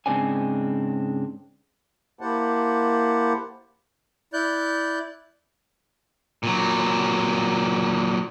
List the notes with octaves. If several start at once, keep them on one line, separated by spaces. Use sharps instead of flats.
G#2 C#3 C4 D4 G#5
A#3 E4 G4 C5 F#5 A5
E4 D5 F#6 G6
A#2 F#3